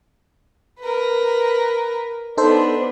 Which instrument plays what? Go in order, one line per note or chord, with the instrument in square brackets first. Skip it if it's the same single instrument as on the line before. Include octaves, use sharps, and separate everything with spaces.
[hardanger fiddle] A#4 B4
[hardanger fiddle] B3 D4 [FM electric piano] D#4 A4 C5